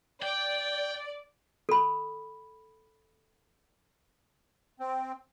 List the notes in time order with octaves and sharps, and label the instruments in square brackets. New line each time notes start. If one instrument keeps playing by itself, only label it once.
[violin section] D5 [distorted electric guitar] G5
[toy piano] A4 B5
[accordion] C4